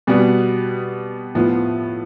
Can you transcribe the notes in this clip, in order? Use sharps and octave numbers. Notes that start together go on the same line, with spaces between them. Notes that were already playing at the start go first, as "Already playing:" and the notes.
B2 G3 B3
A2 F3 B3